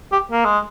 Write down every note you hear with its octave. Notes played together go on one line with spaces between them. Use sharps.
G4
A#3
G#3